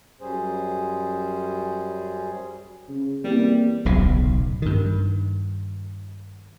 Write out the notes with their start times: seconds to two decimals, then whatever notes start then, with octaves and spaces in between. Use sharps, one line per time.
0.21 F#2 G3 C#4 G#4 C5
2.89 C#3
3.24 E2 G3 A#3 C4
3.85 D1 B1 C#3
4.62 G2 D#3